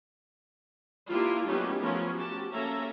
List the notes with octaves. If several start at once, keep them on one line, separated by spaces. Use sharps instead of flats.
A#3 D4 E4 F4 G4
F#3 A3 B3 C#4 D#4 G4
F3 A3 B3 C#4 F4 A#4
F#4 G4 A5
A#3 C#4 A4 E5 A#5